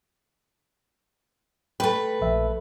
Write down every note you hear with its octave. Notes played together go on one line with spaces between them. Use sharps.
A3 B4 G5 B5
A#1 E5